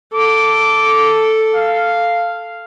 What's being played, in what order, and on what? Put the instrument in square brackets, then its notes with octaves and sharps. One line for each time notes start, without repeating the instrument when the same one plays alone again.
[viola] A4 [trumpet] D6
[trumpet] F5